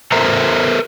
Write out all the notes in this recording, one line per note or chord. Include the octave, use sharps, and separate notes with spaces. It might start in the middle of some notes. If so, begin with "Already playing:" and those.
A4 A#4 C5 E5 A#5